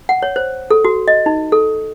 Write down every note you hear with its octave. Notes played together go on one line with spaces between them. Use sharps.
F#5
C#5
C5
A4
F#4
D#5
D#4
A4